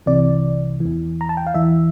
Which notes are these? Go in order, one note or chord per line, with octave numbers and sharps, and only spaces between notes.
C2 C3 E3 D5
E3
E2
A#5
A5
G5
F5
E2 E3 E5